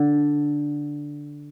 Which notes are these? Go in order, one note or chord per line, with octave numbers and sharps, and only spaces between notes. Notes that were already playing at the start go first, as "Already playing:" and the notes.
Already playing: D3